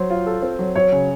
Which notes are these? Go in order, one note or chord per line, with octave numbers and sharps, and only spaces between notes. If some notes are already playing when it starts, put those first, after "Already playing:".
Already playing: F#3 C5
F4
A4
C4
F#3
F#3 C#5
C#3